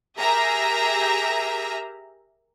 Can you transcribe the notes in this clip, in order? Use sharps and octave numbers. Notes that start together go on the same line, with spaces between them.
G4 G#4 A#4 E5 A#5